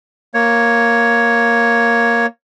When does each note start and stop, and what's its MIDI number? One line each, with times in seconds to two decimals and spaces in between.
0.34 2.26 58
0.34 2.26 73